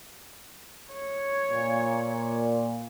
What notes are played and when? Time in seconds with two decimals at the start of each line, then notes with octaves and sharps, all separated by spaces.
0.92 C#5
1.51 A#2